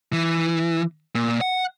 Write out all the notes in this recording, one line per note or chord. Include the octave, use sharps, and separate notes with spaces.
E3
A#2
F#5